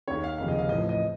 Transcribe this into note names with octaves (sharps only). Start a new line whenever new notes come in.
D#2 D#3 C#5
F5
F1 D#2 C#3 F3 F5
D#5
F5
A1 A2 F3 D#5
D#5